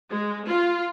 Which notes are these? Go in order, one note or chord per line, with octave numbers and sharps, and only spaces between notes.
G#3
F4